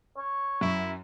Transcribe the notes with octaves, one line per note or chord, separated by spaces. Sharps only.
C#5
F#2 E4